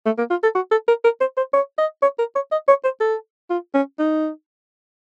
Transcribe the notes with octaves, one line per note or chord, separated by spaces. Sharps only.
A3
A#3
F4
A4
F#4
A4
A#4
A#4
C5
C5
C#5
D#5
C#5
A#4
C#5
D#5
C#5
C5
A4
F4
C#4
D#4